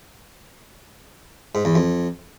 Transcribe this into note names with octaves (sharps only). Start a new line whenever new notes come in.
G#2
E2
F2